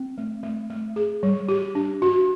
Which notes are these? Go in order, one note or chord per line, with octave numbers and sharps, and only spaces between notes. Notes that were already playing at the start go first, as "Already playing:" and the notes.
Already playing: C4
A3
A3
A3
G#4
G3
G4
D4
F#4